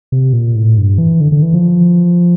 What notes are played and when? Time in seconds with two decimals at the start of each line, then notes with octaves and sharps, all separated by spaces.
0.12 C3
0.33 A#2
0.55 A2
0.78 G2
0.98 E3
1.21 D3
1.32 D3
1.42 E3
1.53 F3